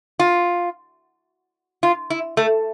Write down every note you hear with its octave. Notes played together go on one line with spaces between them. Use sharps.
F4
F4
E4
A3